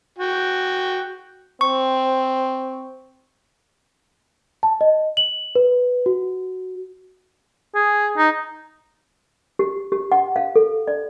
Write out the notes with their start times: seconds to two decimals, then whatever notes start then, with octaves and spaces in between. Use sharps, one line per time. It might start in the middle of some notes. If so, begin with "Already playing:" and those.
0.18 F#4 G5
1.61 C4 C#6
4.63 A5
4.81 D#5
5.17 F#7
5.55 B4
6.06 F#4
7.75 G#4
8.17 D#4
9.59 G4
9.92 G4
10.12 F#5
10.36 F5
10.56 A4
10.88 D5